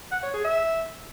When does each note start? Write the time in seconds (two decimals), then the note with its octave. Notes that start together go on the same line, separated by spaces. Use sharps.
0.11 F#5
0.22 C#5
0.34 G#4
0.45 E5